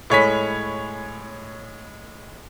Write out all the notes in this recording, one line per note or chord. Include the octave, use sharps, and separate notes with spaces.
A2 G#3 C#5 G#5 B5 B6